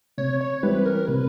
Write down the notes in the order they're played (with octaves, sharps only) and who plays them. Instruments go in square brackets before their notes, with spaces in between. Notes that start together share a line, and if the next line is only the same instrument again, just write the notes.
[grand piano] C3 [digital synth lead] C#5
[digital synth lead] C#5
[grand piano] E3 G3 C4 E4 [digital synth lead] B4
[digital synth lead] A#4
[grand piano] C3 [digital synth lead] B4